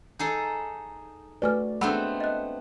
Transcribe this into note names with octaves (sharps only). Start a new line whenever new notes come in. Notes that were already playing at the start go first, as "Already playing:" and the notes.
D#4 G#4 A4
A3 F#4 B4 D5 G#5 F6
G#3 A3 B3 C4 D4 F#5 B5 E6
D#5 F#6